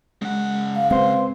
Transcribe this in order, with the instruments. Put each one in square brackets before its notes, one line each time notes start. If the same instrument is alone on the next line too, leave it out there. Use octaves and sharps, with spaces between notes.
[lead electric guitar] C#3 F#5 [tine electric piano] G#3
[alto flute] F5
[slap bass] G#3 C4 [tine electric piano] B4 C5 C6 [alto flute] F5